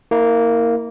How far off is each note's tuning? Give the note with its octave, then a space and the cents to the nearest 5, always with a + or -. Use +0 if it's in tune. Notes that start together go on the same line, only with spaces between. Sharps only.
A#3 -10 E4 -35